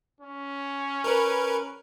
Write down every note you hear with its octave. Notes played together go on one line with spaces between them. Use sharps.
C#4
A#4 B4